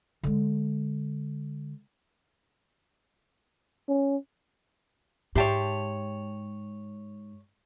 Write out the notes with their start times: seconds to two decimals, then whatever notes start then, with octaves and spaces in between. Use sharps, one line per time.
0.23 D3 G#3
3.88 C#4
5.35 G#2 G4 C#5 E5 G5 A5 C6